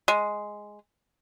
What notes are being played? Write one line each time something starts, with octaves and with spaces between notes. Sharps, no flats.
G#3